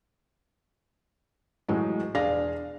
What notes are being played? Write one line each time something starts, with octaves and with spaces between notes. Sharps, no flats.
A2 E3 F#3 G#3
E1 D4 G#4 F5 A#6